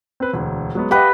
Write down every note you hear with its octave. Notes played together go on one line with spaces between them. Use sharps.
C4 B4
E1 D2
F#3 G#3 B3
G4 B4 D#5 F5 F#5